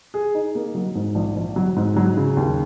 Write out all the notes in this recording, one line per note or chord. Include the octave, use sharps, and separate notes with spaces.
G#4
D#4
A#3
F#3
G#2
A#1
A#1
F#3
G#2
F#3
C#3
D#2